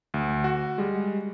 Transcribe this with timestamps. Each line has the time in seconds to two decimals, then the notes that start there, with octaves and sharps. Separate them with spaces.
0.14 D2
0.44 F#4
0.78 G3 G#3